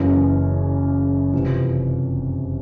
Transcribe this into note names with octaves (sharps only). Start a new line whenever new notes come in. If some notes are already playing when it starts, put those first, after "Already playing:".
Already playing: F#1 F#2 C#3 E3
F1 F2 C3 E3